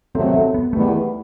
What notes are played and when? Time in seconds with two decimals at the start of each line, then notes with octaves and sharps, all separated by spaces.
0.15 C3 D#3 F#3 A3 C4
0.34 C4
0.54 B3
0.73 E2 D#3 G3 A3 B3 E4